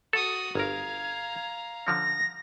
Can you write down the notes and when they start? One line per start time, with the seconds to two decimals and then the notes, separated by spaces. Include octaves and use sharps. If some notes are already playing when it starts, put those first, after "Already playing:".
0.13 F#4 A4 D#6
0.55 G1 A#4 F5 A#5 G#6
1.87 D3 F3 C#4 A#6